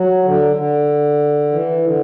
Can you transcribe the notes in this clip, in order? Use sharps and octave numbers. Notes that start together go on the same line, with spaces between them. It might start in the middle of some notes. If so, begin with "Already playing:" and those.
Already playing: F#3
D3
D3
E3
D3